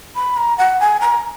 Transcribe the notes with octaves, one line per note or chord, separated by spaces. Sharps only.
B5
A#5
F#5
G#5
A#5